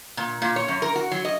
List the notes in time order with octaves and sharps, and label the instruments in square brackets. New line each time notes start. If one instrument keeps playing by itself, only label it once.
[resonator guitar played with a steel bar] A#2
A#2
C#5
F#2
A#4
F#4
F#3
D#5